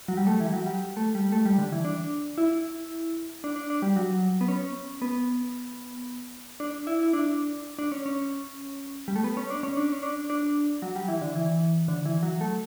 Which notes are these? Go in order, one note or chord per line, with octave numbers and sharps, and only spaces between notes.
F#3
G3
A3
E3
G3
F#3
G3
A3
G3
A3
G3
D3
E3
D4
E4
D4
D4
D4
G3
F#3
B3
C#4
B3
D4
E4
E4
D4
D4
C#4
C#4
G3
A3
B3
C#4
D4
C#4
D4
C#4
D4
D4
F#3
G3
E3
D3
E3
D3
E3
F#3
A3